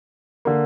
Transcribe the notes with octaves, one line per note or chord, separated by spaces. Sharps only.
D3 A#3